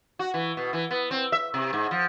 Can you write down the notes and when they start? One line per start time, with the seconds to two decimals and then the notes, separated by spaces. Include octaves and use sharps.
0.19 F#4
0.34 E3
0.57 B2
0.73 E3
0.91 B3
1.11 C4
1.32 E5
1.54 C3
1.73 G#2
1.91 F3